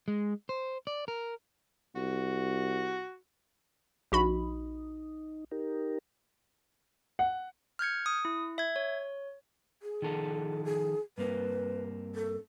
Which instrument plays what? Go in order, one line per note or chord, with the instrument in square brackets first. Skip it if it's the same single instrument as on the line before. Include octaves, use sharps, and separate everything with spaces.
[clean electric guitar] G#3
C5
D5
A#4
[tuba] C2 [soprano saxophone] F#4
[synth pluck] A#1 F#4 B5 [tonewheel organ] D#4
[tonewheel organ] D#4 G4 A#4
[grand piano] F#5
[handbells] F6 G6 G#6 C#7
D#6
E4
E5 G#6
C#5
[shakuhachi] G#4
[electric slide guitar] D#3 F3 A4
[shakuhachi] G#4
[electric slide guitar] G2 A#3 C4 [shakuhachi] B4
[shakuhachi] A4